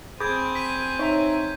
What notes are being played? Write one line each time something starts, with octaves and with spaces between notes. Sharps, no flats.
C4 G#4 G#5 B5 D6 G6 G#6
B6 D#7
D#4 C#5 E5 A#5